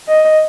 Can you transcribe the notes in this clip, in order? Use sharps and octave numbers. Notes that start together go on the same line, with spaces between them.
D#5